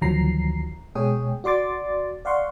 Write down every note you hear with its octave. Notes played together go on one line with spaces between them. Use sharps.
D2 D#3 F3 F#3 A#5 C7
B2 G#3 G#4 C#5 G5 D#6
F#4 D5 C6 D6 A6
D5 F5 F#5 C6 C#6